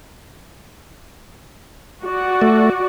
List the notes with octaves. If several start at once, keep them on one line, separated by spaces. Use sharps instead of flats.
F#4 D5
A3